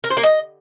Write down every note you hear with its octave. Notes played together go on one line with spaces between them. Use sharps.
A#4
C5
A#3
D#5